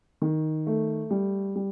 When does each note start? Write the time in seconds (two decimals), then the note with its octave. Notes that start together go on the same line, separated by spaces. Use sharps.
0.22 D#3
0.67 A3
1.11 G3
1.56 G3